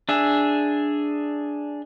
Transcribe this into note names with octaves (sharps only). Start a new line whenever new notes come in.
D4 G#4 E5